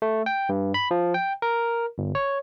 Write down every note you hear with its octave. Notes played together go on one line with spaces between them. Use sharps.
A3
G5
G2
B5
F3
G5
A#4
G1
C#5